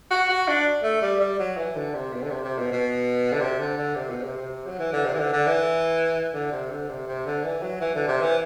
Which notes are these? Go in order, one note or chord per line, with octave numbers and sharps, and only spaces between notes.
F#4
F#4
D4
A3
G3
G3
F#3
E3
D3
C3
B2
D3
C3
C3
B2
B2
D3
C3
D3
D3
C3
B2
C3
C3
F#3
E3
D3
C3
E3
D3
D3
E3
D3
C3
D3
C3
C3
D3
E3
F#3
E3
D3
C3
E3